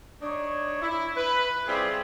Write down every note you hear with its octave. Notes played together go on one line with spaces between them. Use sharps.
D4 D#4 C#5
E4
B4
G3 C4 E4 F4 G4 G#4